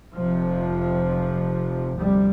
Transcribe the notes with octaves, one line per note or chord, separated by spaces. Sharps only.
F1 F2 C3 F3
D2 C3 G3